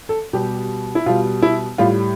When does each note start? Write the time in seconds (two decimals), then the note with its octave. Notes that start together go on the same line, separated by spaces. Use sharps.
0.09 A4
0.33 B2 G3 G4
0.95 E4
1.06 B2 G3 F4
1.42 E4
1.78 A2 G3 F4